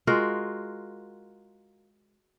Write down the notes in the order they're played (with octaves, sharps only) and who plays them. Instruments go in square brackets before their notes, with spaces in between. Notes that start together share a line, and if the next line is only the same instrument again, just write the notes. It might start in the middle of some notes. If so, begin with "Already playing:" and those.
[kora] G#3 F4 F#4 A#4